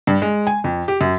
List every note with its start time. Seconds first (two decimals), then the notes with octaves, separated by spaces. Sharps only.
0.07 G2
0.22 G#3
0.47 G#5
0.64 F2
0.88 G4
1.01 F#2